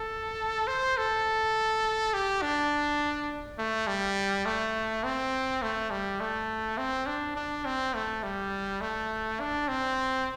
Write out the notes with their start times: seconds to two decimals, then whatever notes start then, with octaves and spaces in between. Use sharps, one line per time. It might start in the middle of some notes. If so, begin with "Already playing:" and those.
Already playing: A4
0.68 C5
0.98 A4
2.14 G4
2.42 D4
3.58 A3
3.87 G3
4.46 A3
5.04 C4
5.63 A3
5.91 G3
6.21 A3
6.78 C4
7.07 D4
7.36 D4
7.66 C4
7.94 A3
8.23 G3
8.81 A3
9.40 D4
9.68 C4